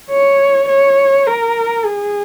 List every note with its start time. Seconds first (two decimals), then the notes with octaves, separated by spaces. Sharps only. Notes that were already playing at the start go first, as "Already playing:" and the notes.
0.10 C#5
0.68 C#5
1.27 A#4
1.85 G#4